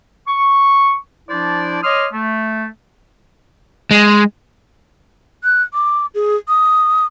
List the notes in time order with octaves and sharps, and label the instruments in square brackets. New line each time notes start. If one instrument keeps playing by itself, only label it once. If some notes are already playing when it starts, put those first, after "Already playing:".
[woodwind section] C#6
F3 D4 E4 C5 D5
C#5 D#5 C6 D6 D#6 F6
A3
[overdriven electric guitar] G#3
[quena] F#6
D6
G#4
D#6